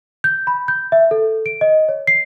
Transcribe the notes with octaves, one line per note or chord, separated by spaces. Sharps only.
G6
B5
G6
E5
A4
D7
D#5
C#5
C7